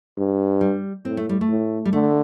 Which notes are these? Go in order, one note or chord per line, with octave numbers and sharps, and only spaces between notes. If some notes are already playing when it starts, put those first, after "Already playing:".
G2
G3
A2 C4
A3
G3
A3
A2
G3
D3 A3